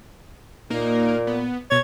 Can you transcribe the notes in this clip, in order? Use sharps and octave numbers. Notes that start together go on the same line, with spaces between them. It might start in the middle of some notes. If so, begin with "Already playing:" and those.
A#2 A#3 D#4 A#4
B3
B2 C#5 G#6 A6